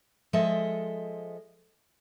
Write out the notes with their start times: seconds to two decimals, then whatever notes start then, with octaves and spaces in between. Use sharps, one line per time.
0.33 F3 G#3 A4 D#5 E5